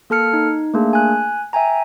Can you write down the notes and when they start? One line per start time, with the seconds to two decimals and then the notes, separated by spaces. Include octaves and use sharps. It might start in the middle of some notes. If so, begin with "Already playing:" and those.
0.10 A#3 A4 A5 F6 C#7
0.34 D#4
0.74 A3 A#3 D4 G#4
0.93 G#5 F#6
1.53 E5 G5 G#5 A#5